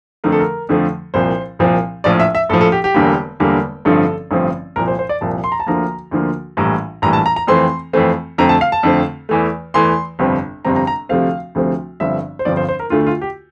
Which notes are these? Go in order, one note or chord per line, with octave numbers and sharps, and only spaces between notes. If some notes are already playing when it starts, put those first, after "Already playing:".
F2 D3 F3 A3 A#4
A4
A#4
F2 D3 F3 A3
C2 A#2 F3 C4 C5
C2 A#2 F3 C4
A#1 A2 F3 D5
E5
E5
A#1 A2 F3 A4
A4
G4
G4
E1 E2 D3 G3 A#3
E1 E2 D3 G3 A#3
A1 G2 D3 F3 C4 A4
A1 G2 D3 F3 C4
C2 A#2 F3 A#4
C5
C5
D5
C2 A#2 F3 A5
C6
A#5
A5
D2 D3 F3 A#3 A#5
D2 D3 F3 A#3
A#1 A2 E3 G3 A#5
A#1 A2 E3 G3 A#5
A5
A#5
A#5
F2 E3 A3 C4 C6
F2 E3 A3 C4
F2 D3 A3 C4 A#5
A5
F5
A5
F2 D3 A3 C4
E2 E3 A3
E2 E3 A3 C6
G1 F2 C3 G3 C4
G1 F2 C3 G3 C4 A#5
A#5
A#5
D2 C3 F3 A3 C4 F5
D2 C3 F3 A3 C4
G1 G2 D3 F3 C4 E5
C5
G1 G2 D3 F3 C4 D5
C5
C5
A#4
D2 D3 A3 F4
F4
G4